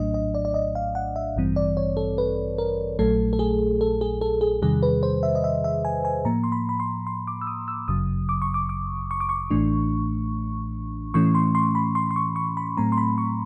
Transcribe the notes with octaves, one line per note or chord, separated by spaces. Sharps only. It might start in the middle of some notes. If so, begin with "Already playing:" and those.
Already playing: A#1 A2 F#3 A3 D4 D#5
D#5
D5
D5
D#5
F5
F#5
E5
A1 G2 E3 G3 C4
D5
C#5
A4
B4
A#4
A#1 A#2 F#3 A3 A4
A4
G#4
A4
G#4
A4
G#4
E2 C3 D#3 G3 G#4
B4
C5
E5
D#5
E5
E5
G#5
G#5
A2 F3 A#3 A#5
C6
B5
B5
C6
C6
D6
E6
D#6
E6
G1 F#2 C#3 F#3 D#6
D6
C#6
D6
D6
C#6
D6
C#6
A1 A2 E3 A3 D4
A2 E3 A3 C#4 C#6
C6
C6
B5
C6
C6
C#6
C#6
B5
A2 F#3 A3 C4 A#5
C6
B5
C#6